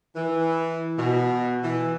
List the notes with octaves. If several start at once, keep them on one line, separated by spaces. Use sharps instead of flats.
E3
B2
E3